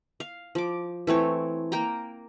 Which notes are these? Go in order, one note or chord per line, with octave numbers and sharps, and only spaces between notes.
F5
F3 D6
E3 A3 C4 C#5
A#3 A#4 G5 A#5